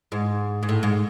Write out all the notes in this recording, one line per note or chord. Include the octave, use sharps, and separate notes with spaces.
G#2
G#2
A2
G#2